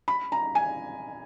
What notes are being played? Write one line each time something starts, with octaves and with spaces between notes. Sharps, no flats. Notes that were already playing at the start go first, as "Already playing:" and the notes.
B5
A#5
G#5